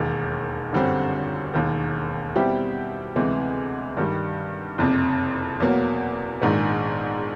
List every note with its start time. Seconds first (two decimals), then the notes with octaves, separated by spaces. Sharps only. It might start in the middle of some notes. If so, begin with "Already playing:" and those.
Already playing: E1 D#2 D#3
0.72 G1 F#2 D3 G3 C4
1.54 E1 D#2 D#3
2.36 B2 G3 C4 E4 G4
3.16 D2 C3 E3 G#3
3.97 G2 D#3 G3
4.78 F#1 F2 C3
5.60 E2 B2 F#3 A#3
6.42 A#1 G#2 D#3 G#3